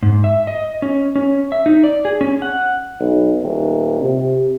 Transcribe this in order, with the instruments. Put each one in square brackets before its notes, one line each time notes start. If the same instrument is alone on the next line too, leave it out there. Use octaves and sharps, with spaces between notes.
[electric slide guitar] G#2
E5
D#5
C#4
C#4
E5
D#4
D5
G#4
C#4
F#5
[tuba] B1
D#1
C3